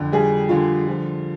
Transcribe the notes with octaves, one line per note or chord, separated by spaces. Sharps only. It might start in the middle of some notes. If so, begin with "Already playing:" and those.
Already playing: F2 D3
G3 G#4
D3 F4
F3